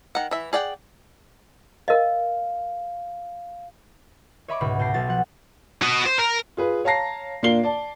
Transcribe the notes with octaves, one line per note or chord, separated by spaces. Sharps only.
D#3 F#5
E3 E5
G#4 D5 F#5 G5
A#4 D#5 F5
C#5 D#5 E5 B5 C#6 D6
C#2 G#2 B2 B5
B2 G5 A5 A#6 C7
B1 B2 A6
F3 F#5
F#4 D#5
C5
A#4
F4 G#4 B4
C#5 F5 A5 A#5 A#6 C7
A#2 A#3 D4 F4 C7 G7
D5 A5